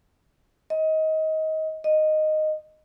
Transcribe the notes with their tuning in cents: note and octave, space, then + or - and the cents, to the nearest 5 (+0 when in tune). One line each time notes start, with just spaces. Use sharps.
D#5 +25
D#5 -5